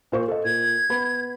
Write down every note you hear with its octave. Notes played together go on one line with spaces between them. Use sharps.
A#2 C5 C#6
A4 D#5
A#2 G#6
B3 B5